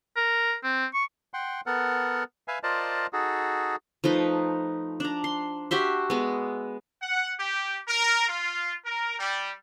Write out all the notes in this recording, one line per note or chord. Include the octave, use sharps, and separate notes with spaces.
A#4
C4
C#6
F#5 G5 C6
B3 A4 A#4 F#5
B4 E5 F5 G#5
F4 A#4 C5 D5 D#5 A5
D#4 F#4 G#4 A4
F3 A3 D#4 B4
D4 A#5
C6
F#4 G4 E5 C6
G#3 B3
F#5
G4
A#4
F4
A#4
G3